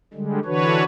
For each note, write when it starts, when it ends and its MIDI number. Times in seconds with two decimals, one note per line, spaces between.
0.14 0.39 50
0.14 0.39 55
0.14 0.39 56
0.45 0.84 50
0.45 0.84 52
0.45 0.84 62
0.45 0.84 66
0.45 0.84 71
0.45 0.84 73